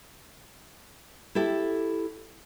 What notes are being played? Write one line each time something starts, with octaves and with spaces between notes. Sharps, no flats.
E4 G4 A4 E5